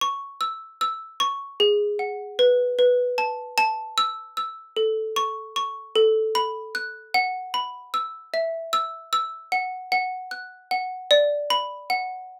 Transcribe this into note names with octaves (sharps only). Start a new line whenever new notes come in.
C#6
E6
E6
C#6
G#4
F#5
B4
B4
A5
A5
E6
E6
A4
C#6
C#6
A4
B5
F#6
F#5
B5
E6
E5
E6
E6
F#5
F#5
F#6
F#5
D5
B5
F#5